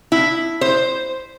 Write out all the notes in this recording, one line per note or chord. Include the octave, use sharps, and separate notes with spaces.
E4
C5